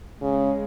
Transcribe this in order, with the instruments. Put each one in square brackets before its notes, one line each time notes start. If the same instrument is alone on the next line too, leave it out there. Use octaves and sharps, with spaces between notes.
[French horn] C#3 [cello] G#3